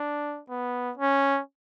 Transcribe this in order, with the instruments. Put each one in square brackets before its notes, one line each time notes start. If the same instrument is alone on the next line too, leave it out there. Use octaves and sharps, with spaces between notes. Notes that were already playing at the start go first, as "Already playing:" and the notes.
Already playing: [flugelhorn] D4
B3
C#4